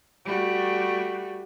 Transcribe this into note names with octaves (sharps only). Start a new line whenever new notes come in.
G3 A3 F#4